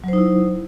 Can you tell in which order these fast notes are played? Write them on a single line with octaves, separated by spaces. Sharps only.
F#3 C5 D#4 E4